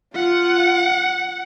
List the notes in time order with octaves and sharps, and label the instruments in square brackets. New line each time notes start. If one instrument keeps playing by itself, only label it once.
[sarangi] F4 [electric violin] F#5